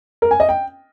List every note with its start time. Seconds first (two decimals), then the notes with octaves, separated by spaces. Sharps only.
0.22 A#4
0.31 G#5
0.40 D#5
0.49 G5